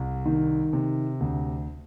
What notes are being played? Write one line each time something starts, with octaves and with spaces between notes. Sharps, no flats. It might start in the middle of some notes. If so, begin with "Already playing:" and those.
Already playing: C2
D#3
C3
D2